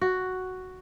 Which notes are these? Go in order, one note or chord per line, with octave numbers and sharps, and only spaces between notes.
F#4